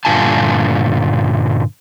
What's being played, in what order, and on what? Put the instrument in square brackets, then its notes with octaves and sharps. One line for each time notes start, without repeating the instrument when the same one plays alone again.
[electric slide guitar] G2 A#2 D3 F4 G#5 A5